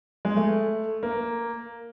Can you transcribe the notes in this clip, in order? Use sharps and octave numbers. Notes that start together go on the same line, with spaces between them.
G#3
A3
A#3